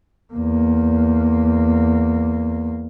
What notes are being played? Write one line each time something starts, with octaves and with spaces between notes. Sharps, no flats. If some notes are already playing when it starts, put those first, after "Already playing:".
E2 A#3